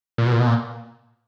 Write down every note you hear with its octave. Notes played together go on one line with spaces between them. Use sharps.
A#2
B2
A#2
B2
A#2